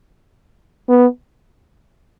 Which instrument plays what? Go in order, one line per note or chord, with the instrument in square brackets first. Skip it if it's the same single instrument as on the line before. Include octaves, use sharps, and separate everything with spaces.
[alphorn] B3